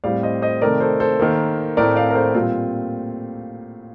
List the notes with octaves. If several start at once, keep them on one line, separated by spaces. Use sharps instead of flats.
A2 G3 C4 D5 F5
C5 D#5
C5 D#5
C3 D#3 A3 A#4 D5
A4 C5
A4 C5
D#3 A#3
A2 A3 C4 A#4 D5
D5 F5
A#4
A4 C5
A#2 G3 C4 F4